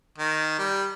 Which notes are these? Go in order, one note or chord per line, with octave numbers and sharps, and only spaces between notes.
D#3
G3